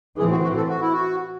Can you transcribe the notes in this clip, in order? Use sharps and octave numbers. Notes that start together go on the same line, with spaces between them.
A2 E3 C4 G#4
F#4
F#4
A4
F#4
E4
F#4